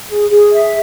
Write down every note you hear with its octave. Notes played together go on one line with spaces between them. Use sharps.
G#4
G#4
E5